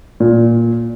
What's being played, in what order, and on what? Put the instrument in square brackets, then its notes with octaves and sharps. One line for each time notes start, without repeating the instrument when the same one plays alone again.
[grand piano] A#2